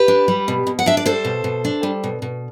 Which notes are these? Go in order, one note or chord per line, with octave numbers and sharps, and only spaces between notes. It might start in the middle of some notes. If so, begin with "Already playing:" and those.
Already playing: G4 B4
D4
G3
B2
B2
F#5
D4 E5
D5
G3 A4 C5
B2
B2
D4
G3
B2
B2